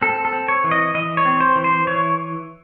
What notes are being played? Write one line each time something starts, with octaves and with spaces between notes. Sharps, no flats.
C4 A4
A4
C4
C#5
E3
D#5
E3 D#5
C#5
C4
C5
E3
C5
E3 C#5